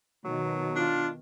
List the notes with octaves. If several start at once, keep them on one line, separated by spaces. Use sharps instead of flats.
B2 D#3 F#3
D4 F4